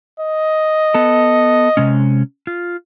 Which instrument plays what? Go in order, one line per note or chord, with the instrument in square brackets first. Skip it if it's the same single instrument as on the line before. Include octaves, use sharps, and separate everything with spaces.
[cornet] D#5
[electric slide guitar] B3 A4
C3 G#3 C#4
F4